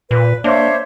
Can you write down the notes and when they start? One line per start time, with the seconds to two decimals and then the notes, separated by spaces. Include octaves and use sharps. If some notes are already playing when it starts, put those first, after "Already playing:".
0.11 A#2 B4
0.44 A#3 D4 C5 C#5 E5